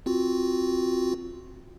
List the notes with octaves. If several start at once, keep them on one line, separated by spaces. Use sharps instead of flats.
C4 F4 F#4